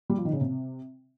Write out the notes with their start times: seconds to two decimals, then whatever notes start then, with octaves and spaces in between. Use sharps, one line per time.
0.10 G3
0.17 F3
0.25 D#3
0.33 C#3
0.41 C3